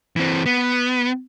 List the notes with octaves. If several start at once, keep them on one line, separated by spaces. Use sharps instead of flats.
E3 C4
B3